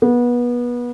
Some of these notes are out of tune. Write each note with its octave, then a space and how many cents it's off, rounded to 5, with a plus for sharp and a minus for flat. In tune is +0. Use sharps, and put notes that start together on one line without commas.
B3 -25